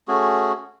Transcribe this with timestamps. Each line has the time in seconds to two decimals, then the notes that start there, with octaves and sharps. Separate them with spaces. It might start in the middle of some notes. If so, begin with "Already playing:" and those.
0.08 A3 C#4 F#4 G#4